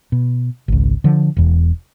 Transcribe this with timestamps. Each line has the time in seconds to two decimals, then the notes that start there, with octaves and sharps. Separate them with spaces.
0.12 B2
0.68 G#1 C#2
1.04 D3 F3
1.37 E1 E2